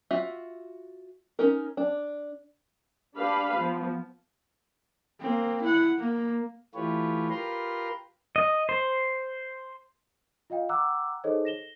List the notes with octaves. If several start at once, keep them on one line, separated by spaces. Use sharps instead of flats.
F4 F#4 E5
C#4 D#4 A#4
D4
D4 G4 B4 F5 B5
F3 B3
A#3 C4
E4 F#5
A#3
E3 A3 F4 G4 B4 C#5
F4 G4 A#4 B4 A#5 C6
D#5
C5
F4 D#5 F5 G5
F#5 G5 A#5 D6 E6 F#6
D#4 G#4 A4 C5 C#5 D#5
A#6 E7 G7